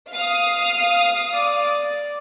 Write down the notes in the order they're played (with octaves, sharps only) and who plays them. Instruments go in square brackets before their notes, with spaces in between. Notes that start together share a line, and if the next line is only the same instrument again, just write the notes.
[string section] F5 D#6
[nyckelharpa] D5